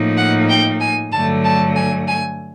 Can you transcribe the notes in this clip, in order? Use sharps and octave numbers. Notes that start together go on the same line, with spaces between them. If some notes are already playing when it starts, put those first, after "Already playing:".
Already playing: A2 F3 A#3 D#4
F#5
G5
G#5
G2 D3 F#3 A3 A5
A5
G#5
G#5